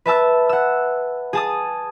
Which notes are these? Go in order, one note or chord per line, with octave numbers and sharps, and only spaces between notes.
B4 E5 A5 E6
F#5 E6
G#4 A5 D#6